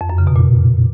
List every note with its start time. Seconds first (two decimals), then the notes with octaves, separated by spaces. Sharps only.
0.01 F2
0.10 F#2
0.18 C#3
0.27 B2
0.36 A#2